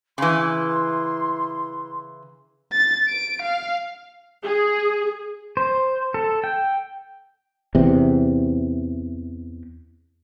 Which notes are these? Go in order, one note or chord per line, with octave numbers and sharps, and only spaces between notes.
C#3 E3 C6
A6
D7
F5
G#4
C5
A4
G5
E2 C3